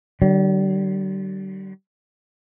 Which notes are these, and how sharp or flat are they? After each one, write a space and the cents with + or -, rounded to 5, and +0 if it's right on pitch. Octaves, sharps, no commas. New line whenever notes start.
D3 +25 G3 -40